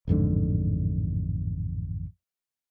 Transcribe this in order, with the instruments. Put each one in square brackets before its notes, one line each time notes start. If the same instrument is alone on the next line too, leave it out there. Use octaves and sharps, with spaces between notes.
[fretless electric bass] A1 F2 G#2 D3